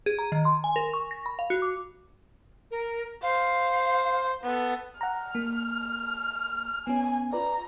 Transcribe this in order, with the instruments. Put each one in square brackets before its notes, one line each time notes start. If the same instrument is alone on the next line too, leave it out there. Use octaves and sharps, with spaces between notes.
[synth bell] G#4
A#5
D#3
C6
G#5
A#4
C#6
A#6
B5
F5
F#4
D6
[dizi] A#4
[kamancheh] C5 [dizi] F5
[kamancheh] B3 A4
[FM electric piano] F#5 A#5 [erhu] F6
[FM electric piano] A#3
[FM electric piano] B3 C#4 [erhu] G#5
[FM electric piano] F4 B4 D5 [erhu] A#5